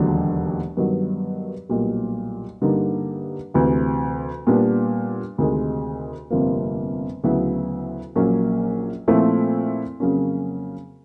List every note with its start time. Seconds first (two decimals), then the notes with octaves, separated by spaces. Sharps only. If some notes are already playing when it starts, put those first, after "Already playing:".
Already playing: E1 D#2 D3 F#3
0.77 G2 D#3 F#3 B3
1.69 B1 A#2 G3
2.62 G2 D3 G3 A#3 D#4
3.54 D2 C3 E3
4.47 A#2 G3 B3 D4
5.38 D2 C3 D#3 G#3
6.30 G1 F2 C3 F3 A#3
7.23 D2 C#3 F#3 B3 E4
8.16 A#1 A#2 F#3 A#3 C#4
9.08 A#2 F3 A3 C4 E4
10.00 F2 C#3 F#3 A#3 C#4